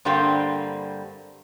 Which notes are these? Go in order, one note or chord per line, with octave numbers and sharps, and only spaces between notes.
G2 D3 G3 A#3 C4